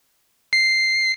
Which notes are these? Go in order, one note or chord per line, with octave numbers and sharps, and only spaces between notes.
C7